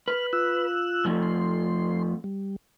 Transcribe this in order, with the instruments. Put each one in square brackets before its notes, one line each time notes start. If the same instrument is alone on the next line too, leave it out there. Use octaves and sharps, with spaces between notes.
[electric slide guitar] B4 [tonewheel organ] F6
[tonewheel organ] F4 E6 F#6
[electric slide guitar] F2 F3 A3
[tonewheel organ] C6
G3